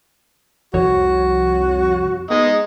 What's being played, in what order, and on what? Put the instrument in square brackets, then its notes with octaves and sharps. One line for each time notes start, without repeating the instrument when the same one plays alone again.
[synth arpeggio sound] C2 F2 C#5 [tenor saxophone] F#4
[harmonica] G#3 D#4 [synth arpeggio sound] B3 G#4